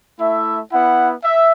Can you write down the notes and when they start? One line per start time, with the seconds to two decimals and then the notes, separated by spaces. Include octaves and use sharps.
0.19 A3 E4 E5
0.72 B3 E4 F#5
1.24 E5